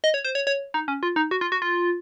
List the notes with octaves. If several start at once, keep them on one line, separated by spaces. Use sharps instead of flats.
D#5
C#5
C5
C#5
C#5
D#4
C#4
F4
D#4
F#4
F4
F#4
F4